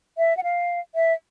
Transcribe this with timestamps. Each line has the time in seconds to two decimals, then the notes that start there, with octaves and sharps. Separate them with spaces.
0.18 E5
0.37 F#5
0.44 F5
0.95 E5